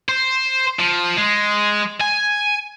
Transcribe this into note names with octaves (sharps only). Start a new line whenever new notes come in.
C5
F3
G#3
G#5